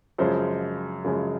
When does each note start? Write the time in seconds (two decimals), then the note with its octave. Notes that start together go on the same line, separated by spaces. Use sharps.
0.18 F#2 C#3 F3 G#3 C5
1.04 F#2 C#3 F3 G#3